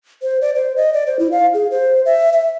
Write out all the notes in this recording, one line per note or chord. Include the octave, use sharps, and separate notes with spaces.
C5
D5
C5
D#5
D5
C5
E4
F5
G#4
C5
E5
E5